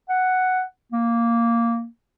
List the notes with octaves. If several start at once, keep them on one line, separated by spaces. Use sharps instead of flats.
F#5
A#3